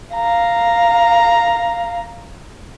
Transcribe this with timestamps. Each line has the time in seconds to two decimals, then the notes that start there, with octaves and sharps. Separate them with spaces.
0.14 F5 A#5